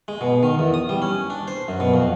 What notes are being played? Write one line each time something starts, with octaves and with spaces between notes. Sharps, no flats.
G#3
B2
D#3
E2
D#6
G3
C#4
D4
C5
F#2
B2
F2